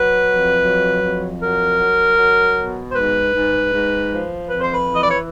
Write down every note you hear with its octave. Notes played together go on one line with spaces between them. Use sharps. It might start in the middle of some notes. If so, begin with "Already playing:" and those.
Already playing: F#3 B4
F2
F#3
F2
F#3 A#4
F#3
F#3
B2
C5
G#2 B4
G#2
G#2
F3
F2 B4
C5
B4
E3
D#5
D5
C#5